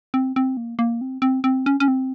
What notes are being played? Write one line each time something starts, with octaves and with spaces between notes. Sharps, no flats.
C4
C4
A#3
A#3
C4
C4
C4
C#4
C#4
C4